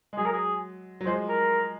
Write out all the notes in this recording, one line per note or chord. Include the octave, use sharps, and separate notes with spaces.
G#3
F#3 G#4
A#4
G#4
F#3
F3 G#3 C5
A#4